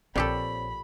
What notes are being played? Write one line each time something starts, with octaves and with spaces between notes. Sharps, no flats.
A#1 A#2 C4 G4 A4 C#5 D5 B5